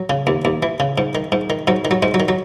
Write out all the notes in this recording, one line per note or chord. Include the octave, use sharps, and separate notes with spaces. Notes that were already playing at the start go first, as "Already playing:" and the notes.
Already playing: F#3
C#3
D#2
D#2
E3
C#3
G#2
D#3
G#2
D#3
G#2 F#3
D#3
F#3
G#2 G#3
F#3
D#3
F#3